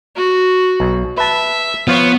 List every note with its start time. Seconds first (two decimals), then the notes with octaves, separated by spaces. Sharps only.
0.17 F#4
0.80 B1
1.17 B4 E5 A5
1.88 F3 B3 F4 C#5